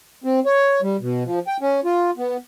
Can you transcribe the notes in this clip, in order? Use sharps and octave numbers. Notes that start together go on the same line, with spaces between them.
C4
C#5
G3
B2
F3
G5
C#4
F4
B3